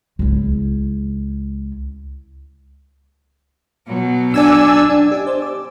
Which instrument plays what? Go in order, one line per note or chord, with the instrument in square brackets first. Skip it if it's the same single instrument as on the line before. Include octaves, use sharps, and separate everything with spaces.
[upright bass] C#2 E4
[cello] B2 F#3
[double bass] D4 [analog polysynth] D5 G#5 E6
[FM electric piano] D4 G5
G4 D#5
C5 D5
D6